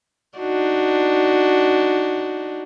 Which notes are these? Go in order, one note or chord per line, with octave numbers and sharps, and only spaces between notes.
D4 D#4 F#4